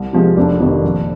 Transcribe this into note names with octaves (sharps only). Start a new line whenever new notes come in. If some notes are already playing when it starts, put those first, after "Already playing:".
Already playing: C2
C3 F3 G#3
F1 D4
F2 C3 D#3
A#1